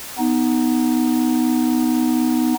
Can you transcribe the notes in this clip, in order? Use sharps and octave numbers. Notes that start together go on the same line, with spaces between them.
B3 D#4